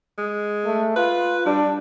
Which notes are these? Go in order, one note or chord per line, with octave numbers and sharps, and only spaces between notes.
G#3
A3
F4 B4
G3 D4